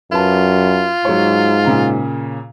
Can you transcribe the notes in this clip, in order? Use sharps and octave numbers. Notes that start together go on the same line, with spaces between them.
F#2 F4 B4 A5
G#2 F#3 C#5
A#2 C#3 A#5